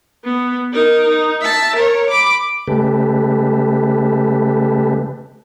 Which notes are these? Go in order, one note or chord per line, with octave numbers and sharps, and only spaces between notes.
B3
D#4 A#4
D#4
E5 A5
A#4 C#5
B5 D6
C#3 G#3 A3 G4 A4 B4